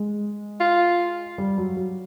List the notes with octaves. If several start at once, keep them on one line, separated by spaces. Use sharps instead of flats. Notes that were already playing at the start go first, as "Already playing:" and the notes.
Already playing: G#3
F4
G3
F#3
F#3